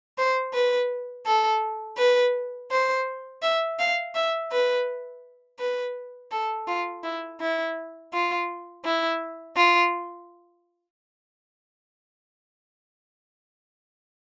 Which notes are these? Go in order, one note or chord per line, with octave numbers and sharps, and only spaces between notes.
C5
B4
A4
B4
C5
E5
F5
E5
B4
B4
A4
F4
E4
E4
F4
E4
F4